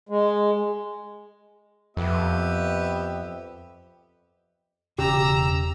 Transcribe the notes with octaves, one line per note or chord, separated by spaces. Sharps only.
G#3
F2 B3 G4 E5
E1 C#3 G4 A#5 E6